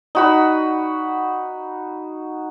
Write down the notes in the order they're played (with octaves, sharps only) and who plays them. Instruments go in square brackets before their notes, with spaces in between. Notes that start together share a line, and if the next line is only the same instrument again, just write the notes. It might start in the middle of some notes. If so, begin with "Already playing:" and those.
[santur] D#4 F#4 B5